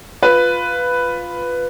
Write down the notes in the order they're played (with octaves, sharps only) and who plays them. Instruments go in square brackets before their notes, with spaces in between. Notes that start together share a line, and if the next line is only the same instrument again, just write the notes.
[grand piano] F4 B4